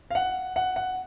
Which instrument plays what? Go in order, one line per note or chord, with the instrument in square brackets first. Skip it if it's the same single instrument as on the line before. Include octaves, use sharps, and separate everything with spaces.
[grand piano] F5
F#5
F#5
F#5